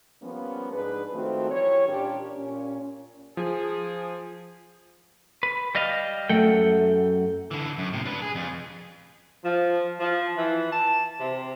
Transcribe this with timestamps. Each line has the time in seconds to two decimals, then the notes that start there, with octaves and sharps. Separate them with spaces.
0.22 F3 G3 A#3 B3 C#4
0.73 G#2 D4 G#4 B4
1.13 D#3 F3 A3 C4 F#4
1.50 E3 G3 C#5
1.87 A#2 C#4 D4 G4
2.36 A#2 C#4
3.37 F3 G#4
5.43 B4
5.75 G3 D#5 F5
6.29 F#2 A3 F#5 G5
7.51 D3 E3
7.78 F#2
7.93 A2 C3
8.06 D4 B4
8.22 G#4
8.35 F2
9.44 F3
10.00 F3
10.36 E3
10.71 A5
11.20 C3